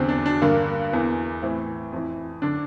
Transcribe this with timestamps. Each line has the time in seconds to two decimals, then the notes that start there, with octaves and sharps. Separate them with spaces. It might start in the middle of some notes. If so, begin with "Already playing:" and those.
Already playing: E2 D3 C4
0.09 D4
0.26 D4
0.42 G2 D3 A#3
0.93 E2 E3
1.42 A2 E3 C4
1.92 F2 E3
2.42 D3 D4